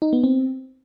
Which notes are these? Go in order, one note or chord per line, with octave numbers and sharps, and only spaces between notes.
D#4
B3
C4